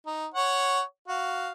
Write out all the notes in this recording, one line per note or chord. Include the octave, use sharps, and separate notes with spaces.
D#4
C#5 F#5
F#4 F5